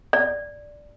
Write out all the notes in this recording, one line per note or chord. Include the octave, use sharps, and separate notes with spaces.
D5